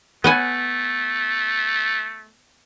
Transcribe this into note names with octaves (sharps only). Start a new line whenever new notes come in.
A3 B3 F#5 G#5